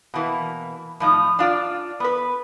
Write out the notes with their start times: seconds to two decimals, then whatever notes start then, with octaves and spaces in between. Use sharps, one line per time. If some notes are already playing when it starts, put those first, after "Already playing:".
0.14 B2 E3 A#3
1.00 A2 F3 D#4
1.39 D4 F4 D5
2.00 B3 B4